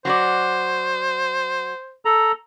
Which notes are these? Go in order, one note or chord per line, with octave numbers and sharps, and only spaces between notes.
F#3 F#4 C5 D5
A4 A#5